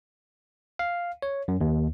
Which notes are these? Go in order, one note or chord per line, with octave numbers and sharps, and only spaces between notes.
F5
C#5
F#2
D#2